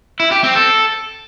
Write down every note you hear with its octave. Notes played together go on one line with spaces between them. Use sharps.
E4
G4
C4
A4